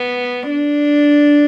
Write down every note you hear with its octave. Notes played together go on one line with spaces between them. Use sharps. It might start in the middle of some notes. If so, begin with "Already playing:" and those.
Already playing: B3
D4